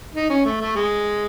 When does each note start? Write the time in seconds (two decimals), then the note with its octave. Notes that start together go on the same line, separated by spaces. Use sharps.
0.15 D#4
0.30 C#4
0.45 A3
0.61 A3
0.76 G#3